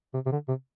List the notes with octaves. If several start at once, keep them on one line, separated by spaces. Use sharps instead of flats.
C3
C3
D3
C3